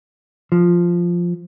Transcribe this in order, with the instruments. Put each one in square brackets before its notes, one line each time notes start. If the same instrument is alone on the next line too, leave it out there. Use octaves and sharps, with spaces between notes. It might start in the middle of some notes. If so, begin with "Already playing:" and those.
[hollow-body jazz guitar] F3